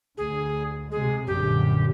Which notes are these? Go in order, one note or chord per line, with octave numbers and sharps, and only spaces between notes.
D2 G#4
C3 G#3 G#4
A#1 F#2 D3 G4